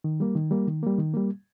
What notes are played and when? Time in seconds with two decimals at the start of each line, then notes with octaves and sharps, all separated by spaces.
0.04 D#3
0.20 G3 A#3
0.36 D#3
0.51 G3 A#3
0.67 D#3
0.83 G3 A#3
0.98 D#3
1.14 G3 A#3